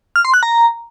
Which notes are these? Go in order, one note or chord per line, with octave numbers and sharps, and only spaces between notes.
F6
C6
F#6
A#5